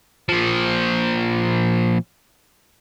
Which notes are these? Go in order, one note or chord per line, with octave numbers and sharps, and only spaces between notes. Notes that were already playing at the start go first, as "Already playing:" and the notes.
A#2 F3